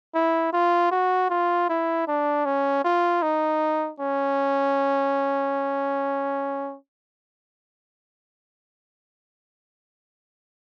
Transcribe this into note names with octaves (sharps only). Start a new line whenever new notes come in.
E4
F4
F#4
F4
E4
D4
C#4
F4
D#4
C#4